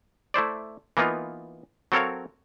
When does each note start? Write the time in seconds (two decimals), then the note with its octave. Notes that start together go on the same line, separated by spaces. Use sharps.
0.34 A3 E4 C5 D5
0.97 E3 A#3 B3 D#4 F4
1.92 F#3 C4 A4 A#4 C#5 F5